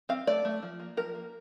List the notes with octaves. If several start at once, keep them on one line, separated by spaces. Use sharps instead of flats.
C4 F5
A3 D5
A3
F3
A#3
F3 A#4
A#3